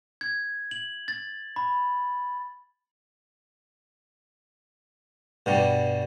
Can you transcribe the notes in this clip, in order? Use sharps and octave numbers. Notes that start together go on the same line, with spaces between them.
G#6
F#7
A6
B5
G2 B2 G3